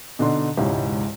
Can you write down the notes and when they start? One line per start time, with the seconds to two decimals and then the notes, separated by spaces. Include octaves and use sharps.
0.19 B2 D3 D4 D#4 C6
0.57 E1 C#2 G#2 C#4 E4 G4